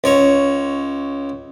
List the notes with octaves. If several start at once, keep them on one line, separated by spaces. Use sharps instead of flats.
C#2 C#5